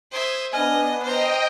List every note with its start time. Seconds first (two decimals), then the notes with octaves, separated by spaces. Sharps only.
0.11 C5 E5 D#6 G#6
0.53 B3 D4 D#5 G#5 F6
1.03 C5 D#5 G5 A#5